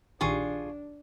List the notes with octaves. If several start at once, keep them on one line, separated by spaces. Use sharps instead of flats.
A#1 D#3 D4 F4 G4 G#4 C#6